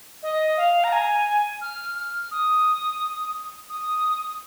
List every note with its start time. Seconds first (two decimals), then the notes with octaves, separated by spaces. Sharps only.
0.23 D#5
0.57 F5
0.84 A#5
0.92 G#5
1.61 F6
1.95 F6
2.31 D#6
3.70 D#6